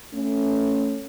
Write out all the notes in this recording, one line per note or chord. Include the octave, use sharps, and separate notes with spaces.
A3 C#4